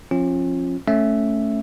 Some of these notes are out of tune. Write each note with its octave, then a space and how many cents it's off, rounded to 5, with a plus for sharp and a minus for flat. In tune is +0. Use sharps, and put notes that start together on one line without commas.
F3 +0 C#4 -35 F4 +0
A3 +0 C#4 +0 E5 +0